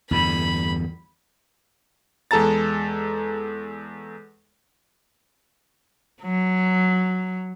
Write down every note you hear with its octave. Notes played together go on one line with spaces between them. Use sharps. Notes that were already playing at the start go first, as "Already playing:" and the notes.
E2 G2 D3 B5
E2 G#3 A4 A5 A#5 A6
F#3